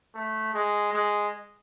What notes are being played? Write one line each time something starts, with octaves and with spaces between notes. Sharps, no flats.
A3
G#3
G#3